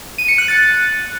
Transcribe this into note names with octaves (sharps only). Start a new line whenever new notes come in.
D#7
C#7
F#6
A6